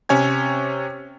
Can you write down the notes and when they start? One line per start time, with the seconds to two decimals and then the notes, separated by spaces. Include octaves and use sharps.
0.09 C3 C#4 C#5 G#5 G#6